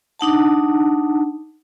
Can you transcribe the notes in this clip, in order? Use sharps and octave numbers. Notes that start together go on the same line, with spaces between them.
D4 D#4 F#5 A5